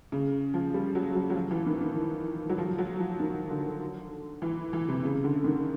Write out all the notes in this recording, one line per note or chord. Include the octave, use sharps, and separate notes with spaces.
C#3
F3
G3
F#3
F#3
F#3
F3
E3
D#3
D#3
F#3
F3
F#3
F3
D#3
D3
E3
E3
C3
C#3
D3
D#3